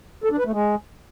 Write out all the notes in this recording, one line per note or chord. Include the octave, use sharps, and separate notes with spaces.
A4
D4
B4
A3
G#3